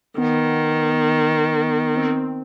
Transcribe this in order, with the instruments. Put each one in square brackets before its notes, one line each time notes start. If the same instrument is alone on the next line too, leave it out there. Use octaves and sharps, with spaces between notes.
[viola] D#3 [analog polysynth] B3
[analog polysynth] C4